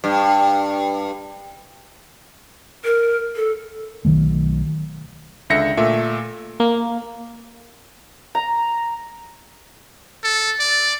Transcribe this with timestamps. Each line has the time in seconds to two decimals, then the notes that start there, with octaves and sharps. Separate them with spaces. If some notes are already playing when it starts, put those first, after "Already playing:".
0.04 G2
2.85 A#4
3.36 A4
4.05 B1 D#3 F#3 A3
5.50 C#2 D3 E5 A#6 C#7
5.77 A#2 A3 E5
6.60 A#3
8.35 A#5
10.24 A4
10.60 D5